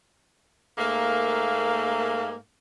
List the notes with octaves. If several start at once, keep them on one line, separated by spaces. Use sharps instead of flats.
G#2 A3 A#3